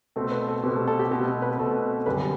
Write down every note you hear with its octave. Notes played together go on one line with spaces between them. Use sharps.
B2 A3 C4 A4
B4
A4
B2 A3 C4 G4
A4
A4
G4
B2 A3 C4 G4
B4
B2 A3 C4 A4
F#2 D3 G3 B4